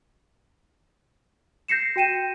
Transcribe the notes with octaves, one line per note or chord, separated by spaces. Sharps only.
G6 A#6 C7 C#7 E7
F#4 G5 D#7 E7